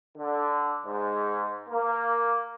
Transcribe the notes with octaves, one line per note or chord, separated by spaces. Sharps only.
D3
G#2
A#3